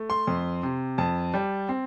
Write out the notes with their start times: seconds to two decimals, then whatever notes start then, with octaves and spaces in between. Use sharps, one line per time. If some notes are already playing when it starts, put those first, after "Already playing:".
Already playing: A3
0.10 C6
0.27 F2
0.63 C3
0.98 F2 A5
1.34 G3
1.69 C4